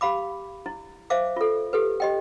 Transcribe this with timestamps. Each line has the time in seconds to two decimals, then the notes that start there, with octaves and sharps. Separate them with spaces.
0.01 G4 F5 B5 D6
0.66 E4
1.10 C5 E5 F5 D6
1.36 F4 A4
1.73 G4 A4 B4
2.00 G4 D#5 G5